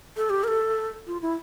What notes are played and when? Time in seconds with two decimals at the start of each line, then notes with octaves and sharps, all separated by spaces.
0.17 A4
0.30 G4
0.44 A#4
0.48 A4
1.07 F4
1.22 E4